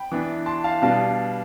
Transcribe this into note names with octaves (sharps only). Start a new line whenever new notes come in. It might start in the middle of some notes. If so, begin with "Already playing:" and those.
Already playing: G5 B5
E3 B3 D4
A5 C6
F5 A5
B2 G3 B3 D4 F5 A5